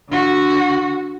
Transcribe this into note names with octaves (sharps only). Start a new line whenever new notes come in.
D3 F#4